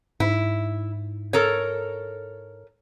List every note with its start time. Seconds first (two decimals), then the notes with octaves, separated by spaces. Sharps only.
0.20 G#2 E4
1.33 A4 A#4 C#5